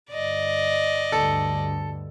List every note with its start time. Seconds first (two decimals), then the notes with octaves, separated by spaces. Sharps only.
0.11 G1 D5 D#5
1.12 D2 G2 A4